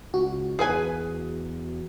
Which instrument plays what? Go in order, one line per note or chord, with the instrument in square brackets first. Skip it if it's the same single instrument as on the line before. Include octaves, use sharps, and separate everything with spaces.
[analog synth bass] C#2 [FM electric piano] F#4
[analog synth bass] E2 [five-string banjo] G#4 B4 G#5